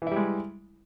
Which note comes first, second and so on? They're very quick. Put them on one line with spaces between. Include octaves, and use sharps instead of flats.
E3 E4 G3 G#3